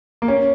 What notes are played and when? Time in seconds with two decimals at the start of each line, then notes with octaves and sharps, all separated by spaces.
0.22 A#3
0.28 C#4